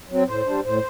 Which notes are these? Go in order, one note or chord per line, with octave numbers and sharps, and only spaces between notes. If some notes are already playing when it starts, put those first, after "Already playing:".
F#3 C4
A2 C5
G3 D4
A2 C5